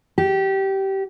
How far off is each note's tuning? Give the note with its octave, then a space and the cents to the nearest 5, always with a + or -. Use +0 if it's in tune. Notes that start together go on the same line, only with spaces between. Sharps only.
G4 -20